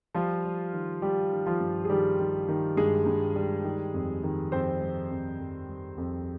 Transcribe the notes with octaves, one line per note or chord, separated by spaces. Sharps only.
F3 G3 F4
G3
D#3
G3 G4
D#3
F3 F4
G2
G#4
D#3 G3 G4
D#3
D#3
G2 G#3 G#4
G2
G3
D#3
F2
D#3
F2 C4 C5
G3
F2
F2
G3
F2